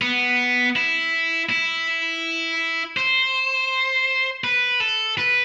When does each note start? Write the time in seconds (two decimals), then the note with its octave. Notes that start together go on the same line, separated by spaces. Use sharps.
0.02 B3
0.76 E4
1.49 E4
2.97 C5
4.44 B4
4.80 A4
5.18 B4